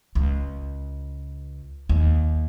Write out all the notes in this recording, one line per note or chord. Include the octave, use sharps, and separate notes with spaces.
C#2
D#2